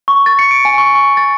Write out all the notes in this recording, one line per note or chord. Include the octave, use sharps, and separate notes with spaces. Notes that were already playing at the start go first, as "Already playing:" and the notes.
C#6
A6
C#7
D7
G#5
C#6
C#6
A6